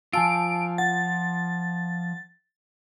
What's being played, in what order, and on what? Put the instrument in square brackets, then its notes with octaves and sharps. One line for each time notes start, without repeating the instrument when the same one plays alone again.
[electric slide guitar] F3 F4 [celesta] G#5 A5 E6 [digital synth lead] D7
[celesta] F#5 [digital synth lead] A6